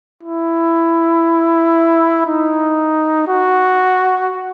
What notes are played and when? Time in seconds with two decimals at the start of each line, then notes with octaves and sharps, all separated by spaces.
0.23 E4
2.26 D#4
3.27 F#4